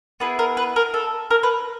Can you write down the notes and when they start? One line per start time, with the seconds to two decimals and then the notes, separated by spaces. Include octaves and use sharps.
0.20 B3 E4 G#4 B4
0.39 A#4
0.57 B4
0.76 A#4
0.94 A4
1.31 A#4
1.43 B4